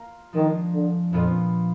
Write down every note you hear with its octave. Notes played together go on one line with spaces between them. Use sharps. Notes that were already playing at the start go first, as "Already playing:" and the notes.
Already playing: A#3 F4 A#4
D#3 F3 G#3 D4
D3
F2 A#2 F3 B3 F4